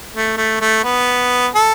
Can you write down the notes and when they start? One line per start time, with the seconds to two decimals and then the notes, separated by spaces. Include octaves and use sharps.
0.13 A3
0.37 A3
0.61 A3
0.84 B3
1.55 A4